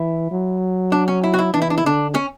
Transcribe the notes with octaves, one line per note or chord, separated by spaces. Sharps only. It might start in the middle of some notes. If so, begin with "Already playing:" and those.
Already playing: E3 E4
F#3
D4
C#4
E4
F#4
E4
E3 D4
E4
D4
E4
D3 D4
C#4